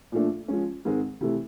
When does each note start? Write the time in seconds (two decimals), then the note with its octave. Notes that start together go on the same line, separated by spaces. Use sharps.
0.12 A#2 F3 A3 D4
0.48 F3 G#3 C#4
0.85 G#2 D#3 G#3 C4
1.21 C3 E3 A3